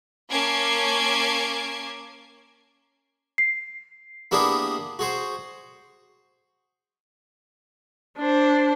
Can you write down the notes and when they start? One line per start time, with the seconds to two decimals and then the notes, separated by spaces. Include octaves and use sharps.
0.30 A#3 C#4 A5 D6 G#6 C7
3.38 C7
4.31 A#3 B3 D4 E4 G4 G#4
4.99 F#4 G#4 C5
8.18 D4 C5